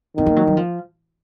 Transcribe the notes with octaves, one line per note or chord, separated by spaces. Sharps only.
D#3 C4
A#3
F#3
F#3
F3